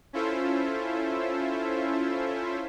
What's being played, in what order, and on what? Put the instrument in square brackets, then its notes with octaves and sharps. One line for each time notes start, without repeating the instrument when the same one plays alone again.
[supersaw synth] C#4 E4 F4 A4 C5 E5